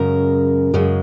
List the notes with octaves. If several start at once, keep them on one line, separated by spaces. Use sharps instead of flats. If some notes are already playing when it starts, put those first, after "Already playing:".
Already playing: F#2 C#3 G#3 A#4
F#2 C#3 G#3